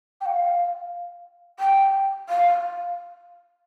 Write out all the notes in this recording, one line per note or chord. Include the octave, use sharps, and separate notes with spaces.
G5
F5
G5
F5